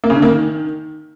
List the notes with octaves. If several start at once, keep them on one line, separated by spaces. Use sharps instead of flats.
A#3
C#3
D3
A#3
D#3